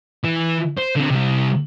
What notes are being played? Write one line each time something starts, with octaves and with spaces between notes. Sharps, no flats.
E3
C5
D3 C4
C3 G3